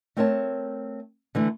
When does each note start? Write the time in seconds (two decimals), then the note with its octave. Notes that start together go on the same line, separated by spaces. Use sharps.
0.17 A3 C4 A#4 C#5 F#5 A5
1.35 D3 E3 A3